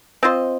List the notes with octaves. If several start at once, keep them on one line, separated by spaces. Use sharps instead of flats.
C4 F4 C5 D#5